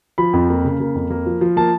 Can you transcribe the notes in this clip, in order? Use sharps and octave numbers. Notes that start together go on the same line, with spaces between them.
F3 B5
F2
A#3
C#3
A#3
F2
A#3
F3
F3
A#3 A5